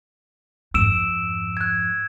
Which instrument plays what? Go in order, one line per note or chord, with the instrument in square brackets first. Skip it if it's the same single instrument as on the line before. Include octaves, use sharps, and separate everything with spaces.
[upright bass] F2 G#2 [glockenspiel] E6 D7 E7
[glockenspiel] F#6 G#6